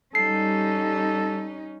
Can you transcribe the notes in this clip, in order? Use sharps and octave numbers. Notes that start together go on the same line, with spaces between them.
G3 C#4 D#4 A4 C7